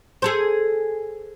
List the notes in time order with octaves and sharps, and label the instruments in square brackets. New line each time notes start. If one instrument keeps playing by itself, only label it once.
[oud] G#4 A4 C5